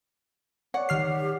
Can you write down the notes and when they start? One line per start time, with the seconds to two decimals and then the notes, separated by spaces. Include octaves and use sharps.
0.74 C#5 D5 F#5
0.89 D#3 G4 F6 C7